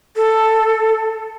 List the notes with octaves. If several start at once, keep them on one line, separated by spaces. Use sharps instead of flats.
A4